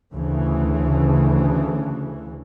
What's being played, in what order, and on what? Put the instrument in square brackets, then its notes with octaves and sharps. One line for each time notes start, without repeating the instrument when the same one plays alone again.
[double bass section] D2 C#3 E3